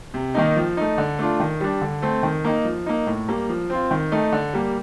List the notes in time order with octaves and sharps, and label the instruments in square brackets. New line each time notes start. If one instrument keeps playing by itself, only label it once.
[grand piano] C3
D#3 A#3 D#4
F3
A3 D#4
D3
A3 D4 F4
D#3
G3 D4
D3
A3 C4
D#3
A#3 D#4
F3
A#3 D#4
A2
G3 A#3
F3
C4 F4
D#3
A3 D#4
D3
G3 A#3